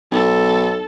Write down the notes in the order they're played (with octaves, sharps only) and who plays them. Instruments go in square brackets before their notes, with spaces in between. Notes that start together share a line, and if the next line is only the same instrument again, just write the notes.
[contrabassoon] B1 [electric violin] A4